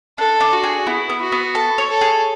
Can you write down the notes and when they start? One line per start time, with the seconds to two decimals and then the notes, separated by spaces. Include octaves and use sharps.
0.18 D4 A4
0.40 D4
0.52 F#4
0.63 G#4
0.87 B3 E4
1.10 B3
1.21 F#4
1.32 B3
1.55 A4 A5
1.78 C#5
1.89 A4
2.01 G#4